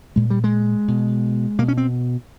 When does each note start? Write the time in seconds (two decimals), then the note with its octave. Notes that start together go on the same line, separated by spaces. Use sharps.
0.16 A#2 G#3
0.30 G3
0.44 G#3
0.88 B2
1.58 B2 A#3
1.68 C#4
1.77 C4